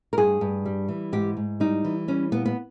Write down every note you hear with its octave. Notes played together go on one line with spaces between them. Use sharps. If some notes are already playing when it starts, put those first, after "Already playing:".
A#4
G2 G#4
G2
G3
E3
G#2 G4
G#2
G3 D#4
E3
G3 C#4
A#2 B3
B3